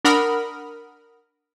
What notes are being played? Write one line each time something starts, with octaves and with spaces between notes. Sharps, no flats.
D4 A#4 F#5 B5 D#6 F6